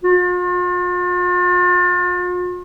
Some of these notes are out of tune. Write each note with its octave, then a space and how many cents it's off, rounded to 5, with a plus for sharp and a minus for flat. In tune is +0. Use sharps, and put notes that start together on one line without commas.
F4 +40